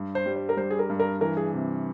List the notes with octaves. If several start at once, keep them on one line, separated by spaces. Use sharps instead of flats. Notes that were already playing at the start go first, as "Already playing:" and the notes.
Already playing: G2
C5
G3
C5
A#4
G3 C5
G#4
A#4
G2
A#4
E3 A#4
G#4
C3